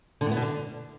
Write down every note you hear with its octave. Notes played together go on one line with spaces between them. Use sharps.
D3
A2
B3
B2
D3